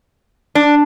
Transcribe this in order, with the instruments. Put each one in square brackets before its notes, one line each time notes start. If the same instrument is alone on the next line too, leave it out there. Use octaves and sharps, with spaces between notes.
[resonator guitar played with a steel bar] D4